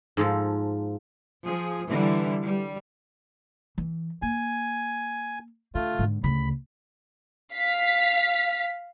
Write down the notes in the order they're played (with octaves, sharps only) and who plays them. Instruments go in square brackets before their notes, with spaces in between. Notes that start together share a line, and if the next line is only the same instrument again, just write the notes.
[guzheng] G#2 F3 A4
[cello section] F3 G#4
D3 E3 G3
G3
[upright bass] E3
[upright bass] A#3 [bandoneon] G#5
[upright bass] D3 [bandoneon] A3 F4
[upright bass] G#2 D3
[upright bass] D2 C#3 [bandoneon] B5
[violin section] F5 B6